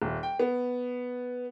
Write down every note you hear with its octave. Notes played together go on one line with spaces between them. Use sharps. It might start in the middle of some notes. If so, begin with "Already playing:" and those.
D#1
G5
B3